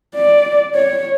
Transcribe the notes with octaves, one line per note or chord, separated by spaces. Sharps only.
D5
C#5